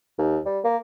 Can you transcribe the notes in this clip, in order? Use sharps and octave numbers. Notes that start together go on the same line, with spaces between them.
D#2
G3
A#3